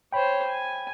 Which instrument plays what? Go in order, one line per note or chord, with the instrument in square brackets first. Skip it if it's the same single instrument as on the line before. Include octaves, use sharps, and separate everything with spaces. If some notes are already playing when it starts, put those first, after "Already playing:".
[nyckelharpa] C5 C#5 [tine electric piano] G5 B5
[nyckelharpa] G#5